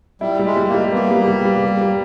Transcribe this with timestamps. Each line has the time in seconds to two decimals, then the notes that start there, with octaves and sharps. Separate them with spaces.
0.21 G3 E4
0.39 G3
0.46 G#3
0.57 G3
0.68 A#3
0.74 G3
0.92 A#3 B3
1.11 G3
1.28 G3
1.45 G3
1.64 G3
1.81 G3